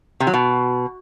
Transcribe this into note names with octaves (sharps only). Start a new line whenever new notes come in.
C3
F#3
B2